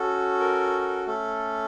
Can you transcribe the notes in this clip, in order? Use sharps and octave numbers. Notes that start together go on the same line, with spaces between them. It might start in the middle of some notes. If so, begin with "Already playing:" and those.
Already playing: C#4 F#4 A4
A#4
A3 C#4 A4